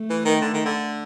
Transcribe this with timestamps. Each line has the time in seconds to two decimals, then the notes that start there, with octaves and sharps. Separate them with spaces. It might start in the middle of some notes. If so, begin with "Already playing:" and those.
Already playing: A3
0.10 E3
0.25 D#3
0.42 D3
0.53 D#3
0.65 D3